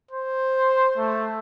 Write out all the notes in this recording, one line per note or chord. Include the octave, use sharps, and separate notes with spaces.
C5
A3